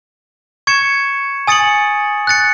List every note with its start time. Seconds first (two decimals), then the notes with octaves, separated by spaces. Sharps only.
0.67 C#6 G#6 C#7 E7
1.47 G#5 D#6 A6 C#7 F#7
2.27 F#6 A6 C#7